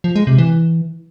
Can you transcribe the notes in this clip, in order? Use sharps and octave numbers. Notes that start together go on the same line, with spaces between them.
F3
G#3
C3
E3